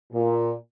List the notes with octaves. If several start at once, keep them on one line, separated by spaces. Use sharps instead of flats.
A#2